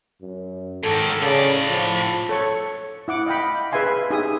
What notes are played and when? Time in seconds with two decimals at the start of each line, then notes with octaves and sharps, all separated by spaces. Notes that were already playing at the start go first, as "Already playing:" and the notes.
0.22 F#2
0.84 G#2 D#3 A4
1.22 A2 C#3 D5
1.70 F3
2.29 A4 C#5 C#6
3.08 E4 F#5 D6
3.26 D#5 F5 G5 B5
3.72 G#4 B4 E5 F5 G#5 C6
4.10 D#4 G4 G#4 E5 G#5 D#6